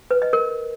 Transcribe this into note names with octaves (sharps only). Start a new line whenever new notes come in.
B4
D#5
A#4